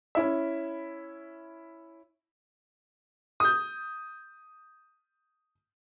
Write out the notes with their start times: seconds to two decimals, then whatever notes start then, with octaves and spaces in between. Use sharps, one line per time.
0.15 C#4 E4 E5
3.40 D#6 G6